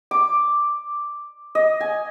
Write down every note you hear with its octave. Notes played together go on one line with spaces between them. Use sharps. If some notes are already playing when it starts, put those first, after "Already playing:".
D6
D#5
G#5